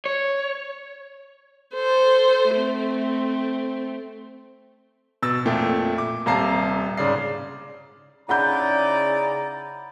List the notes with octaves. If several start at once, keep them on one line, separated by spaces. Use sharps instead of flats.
C#5
A4 C5
A3 C4
B2 E6 A6
F2 A#2 A3 G5
D6
D#1 C3 F5 A5 A#5 C7
G#2 C#3 D5 C7
C#3 D#4 E4 D5 F#5 A#5 B5 G6